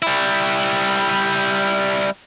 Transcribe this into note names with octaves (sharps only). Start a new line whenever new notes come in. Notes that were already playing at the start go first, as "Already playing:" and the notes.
G3 E4